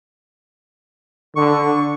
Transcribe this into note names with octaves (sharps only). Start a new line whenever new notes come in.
D3 C#6